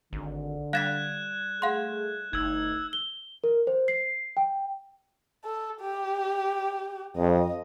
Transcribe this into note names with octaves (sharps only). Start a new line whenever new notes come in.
G#1 D3
G3 F5 F#6 G#6 A6 B6 E7
A3 G#4 F5 F#5 C6
G1 A3 D#4 E6 G#6
G7
A#4
C5
C7
G5
A4
G4
F2 D#5